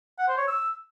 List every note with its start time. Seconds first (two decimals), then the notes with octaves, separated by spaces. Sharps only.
0.19 F#5
0.28 C5
0.38 C#5
0.47 E6